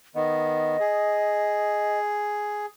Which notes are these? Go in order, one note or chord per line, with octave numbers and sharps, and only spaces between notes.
D#3 B3 D#5
G#4